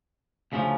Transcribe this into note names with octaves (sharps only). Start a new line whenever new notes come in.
D2 C#3 F3